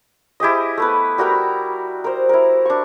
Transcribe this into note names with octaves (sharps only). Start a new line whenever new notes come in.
E4 G4 G#4 D#5
A3 B3 B4
G3 F#4 A#4 G5
A#4 C5
E4 A#4
D4 C#6